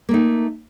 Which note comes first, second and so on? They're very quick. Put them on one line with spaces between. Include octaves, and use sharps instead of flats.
A#3 A3 D#4